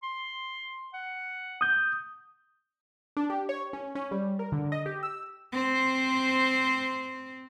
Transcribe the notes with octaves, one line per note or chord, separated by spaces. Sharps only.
C6
F#5
D#6 G6
D4
G4
C#5
C#4
C#4
G3
A#4
D3
D#5
G4
E6
C4 C5